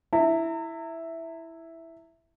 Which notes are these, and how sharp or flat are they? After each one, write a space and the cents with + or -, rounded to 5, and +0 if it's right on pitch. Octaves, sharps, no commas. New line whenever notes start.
E4 +0 A#5 -40